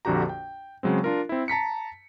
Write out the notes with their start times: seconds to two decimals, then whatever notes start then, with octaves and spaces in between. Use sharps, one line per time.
0.05 A#1 F2 D3 F#4 G4 A#5
0.29 G5
0.83 C#3 F#3 G#3 C4
1.04 D4 F4 A#4
1.29 C4 E4
1.48 A5 A#5 B6 C#7